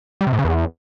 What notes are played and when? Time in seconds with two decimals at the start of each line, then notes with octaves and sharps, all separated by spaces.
0.21 G3
0.27 C3
0.33 A2
0.39 C#3
0.45 E2